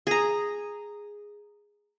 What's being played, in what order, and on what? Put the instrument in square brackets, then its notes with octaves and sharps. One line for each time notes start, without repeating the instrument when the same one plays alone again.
[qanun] G#4 A#5